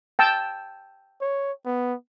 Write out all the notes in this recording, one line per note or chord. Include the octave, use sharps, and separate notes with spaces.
G5 A5 E6
C#5
B3